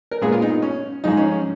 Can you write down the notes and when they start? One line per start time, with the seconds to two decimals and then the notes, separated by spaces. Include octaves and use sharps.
0.11 A#4
0.21 A#2 G#3 B3 G#4
0.32 F4
0.42 D#4
0.62 C#4
1.04 G#2 F3 G#3 D#4
1.17 C#4
1.32 C#4